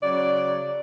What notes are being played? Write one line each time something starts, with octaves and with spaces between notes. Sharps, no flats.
C#3 F#3 D5